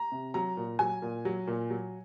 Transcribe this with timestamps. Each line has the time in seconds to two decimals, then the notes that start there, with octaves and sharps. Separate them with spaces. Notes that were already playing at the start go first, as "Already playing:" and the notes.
Already playing: A#5
0.12 C3
0.34 F#3 A#5
0.57 A#2
0.79 F#3 G#5
1.02 A#2
1.25 F#3
1.47 A#2
1.70 F#3